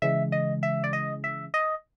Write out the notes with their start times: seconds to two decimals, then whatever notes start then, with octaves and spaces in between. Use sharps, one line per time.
0.02 C#3 E3 G#3 E5
0.32 D#5
0.63 E5
0.84 D5
0.93 D#5
1.24 E5
1.54 D#5